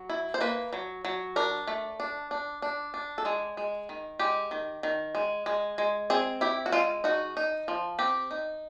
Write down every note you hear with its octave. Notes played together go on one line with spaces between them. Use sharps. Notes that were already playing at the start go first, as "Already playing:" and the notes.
Already playing: F#3
E4
C5
A#3 B4
F#3
F#3
D4 A#4
A3
D4
D4
D4
D4
A4
G#3 G#4
G#3
D#3
G#3 G4
D#3
D#3
G#3
G#3
G#3
C4 G#4
E4 G4
F#4
G#3 F4
D#4 F#4
D#4
F3
C4 G4
D#4